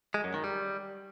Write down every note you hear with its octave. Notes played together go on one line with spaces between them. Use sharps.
G#3
F#2
D#3
G3